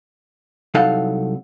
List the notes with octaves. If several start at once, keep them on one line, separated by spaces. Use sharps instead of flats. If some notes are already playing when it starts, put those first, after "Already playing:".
C2 F#3 D#4 A4 F5 F#5